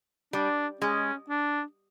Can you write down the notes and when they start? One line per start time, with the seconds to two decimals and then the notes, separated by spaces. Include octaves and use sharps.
0.33 G3 D4
0.81 G#3 C#4
1.29 D4